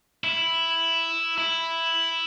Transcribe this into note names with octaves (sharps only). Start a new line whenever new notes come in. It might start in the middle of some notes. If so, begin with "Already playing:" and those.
E4
E4